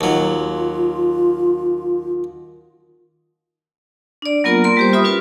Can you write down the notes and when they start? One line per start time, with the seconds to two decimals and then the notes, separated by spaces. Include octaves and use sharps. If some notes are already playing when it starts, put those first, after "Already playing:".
0.01 D#2 F#3 F4
4.22 D4 D5
4.44 F#3 A#3 B3 F4 A#4 A#5
4.64 A#3 A#4 C6
4.77 G3 G4 C5
4.93 F4 E5 B5 D#6
5.04 C#4 F4 F#4 B4